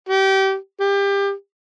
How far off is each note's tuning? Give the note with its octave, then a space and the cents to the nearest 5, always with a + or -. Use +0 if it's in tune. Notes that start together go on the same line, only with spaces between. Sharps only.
G4 -25
G4 +25